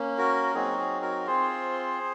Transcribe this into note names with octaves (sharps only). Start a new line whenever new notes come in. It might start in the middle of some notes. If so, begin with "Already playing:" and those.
Already playing: A#3 C#4
F#4 A#4
F#3 C4 D#4 F#4 G#4
G#4
F#4 A#4
C4 F4 G#4 C5